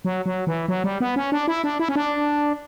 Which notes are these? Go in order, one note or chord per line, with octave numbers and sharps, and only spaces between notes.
F#3
F#3
E3
F#3
G3
B3
C#4
D4
E4
D4
E4
C#4
D4